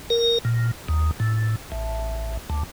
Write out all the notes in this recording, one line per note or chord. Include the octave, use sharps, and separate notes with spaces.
A#4
A#2
D#2
A2
A1
D2